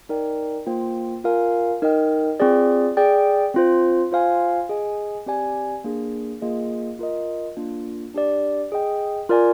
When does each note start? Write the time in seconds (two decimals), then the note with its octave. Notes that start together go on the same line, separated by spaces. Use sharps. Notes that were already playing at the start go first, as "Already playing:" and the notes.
0.09 D#4 A#4 D5 G5
0.66 A#3 F4 C5 G5
1.24 F4 A#4 F5 G#5
1.82 D#4 A#4 D#5 G5
2.40 C4 F4 G#4 D5
2.97 G#4 D5 G5
3.54 C4 F4 C5
4.12 F4 C5 F5 G#5
4.69 G#4 D#5 G#5
5.27 C4 G4 D5 G#5
5.84 A#3 D4 G#4
6.42 A#3 F4 G#4 D#5
6.99 F4 A#4 D#5
7.56 A#3 D4 F4
8.14 D4 G4 D5
8.72 G#4 D#5 G5
9.29 F4 A#4 D5 G#5